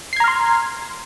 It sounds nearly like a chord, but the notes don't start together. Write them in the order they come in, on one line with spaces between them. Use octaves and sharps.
C7 G#6 A#5 F6 C6